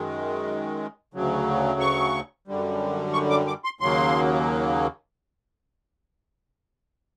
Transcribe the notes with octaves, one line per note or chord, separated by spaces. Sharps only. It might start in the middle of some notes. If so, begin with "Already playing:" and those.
Already playing: F#2 D#3 G#3
D2 C#3 F#3
C#6
F#2 D3 G3
C#6
D6
D6
C6
D#2 C#3 F#3 A#3 C6